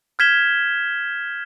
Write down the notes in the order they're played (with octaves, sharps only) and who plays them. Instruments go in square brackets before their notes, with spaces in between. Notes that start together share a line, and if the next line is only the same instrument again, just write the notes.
[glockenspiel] F6 G6 G#6 B6 E7 G7